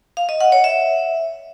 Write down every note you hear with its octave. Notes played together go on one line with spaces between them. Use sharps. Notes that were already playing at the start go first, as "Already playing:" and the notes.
F5
D#5
F#5
C#5
E5